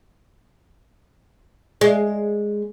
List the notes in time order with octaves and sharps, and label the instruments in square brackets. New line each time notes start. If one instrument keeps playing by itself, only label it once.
[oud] G#3